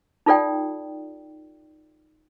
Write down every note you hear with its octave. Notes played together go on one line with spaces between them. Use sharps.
D#4 F4 A4 D5 G5